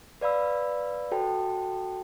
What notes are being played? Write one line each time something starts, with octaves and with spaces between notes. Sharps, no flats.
B4 D5 F5 B5 E6
F#4 A4 C5 G5 A5